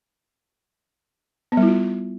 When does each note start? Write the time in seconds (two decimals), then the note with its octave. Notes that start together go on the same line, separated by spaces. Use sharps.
1.52 B3
1.57 G3
1.62 E4
1.68 F4